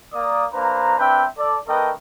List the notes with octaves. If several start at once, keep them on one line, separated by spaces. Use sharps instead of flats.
A#3 D5 D#6
A#3 D4 B4 C5 A#5
C4 D4 B4 E5 G5
A4 D5
A3 D4 A#4 B4 D#5 G5